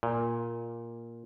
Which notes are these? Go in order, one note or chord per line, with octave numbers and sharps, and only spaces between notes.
A#2